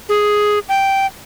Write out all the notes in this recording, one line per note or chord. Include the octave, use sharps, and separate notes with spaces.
G#4
G5